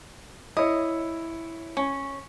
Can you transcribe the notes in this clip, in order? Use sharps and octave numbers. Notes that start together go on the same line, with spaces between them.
E4 C#5 D#5
C#4